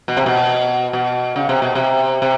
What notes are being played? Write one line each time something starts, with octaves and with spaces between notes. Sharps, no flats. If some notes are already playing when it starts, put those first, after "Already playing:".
B2
C3
B2
B2
C#3
C3
B2
C3
C3